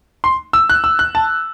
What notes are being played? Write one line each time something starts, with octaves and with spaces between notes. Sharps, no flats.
C6
E6
F#6
E6
F#6
A5